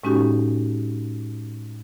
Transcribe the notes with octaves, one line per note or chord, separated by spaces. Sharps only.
A2 G#3 C#4 D#4 F#4 G4